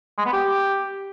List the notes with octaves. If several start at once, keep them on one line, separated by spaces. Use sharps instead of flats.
G#3
B3
G4